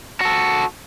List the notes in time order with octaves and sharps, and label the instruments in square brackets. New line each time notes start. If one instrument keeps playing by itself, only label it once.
[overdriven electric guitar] F#4 A4